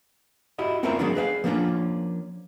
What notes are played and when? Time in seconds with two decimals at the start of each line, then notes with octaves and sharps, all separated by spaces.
0.59 E4 F#4 G4 D#5
0.83 C4 C#4 F4 A#4 B4 E5
0.99 D#3 F#3 G#3 A#3 B3 D4
1.15 G#4 B4 E5 F5
1.44 F3 A#3 C#4 D4 F4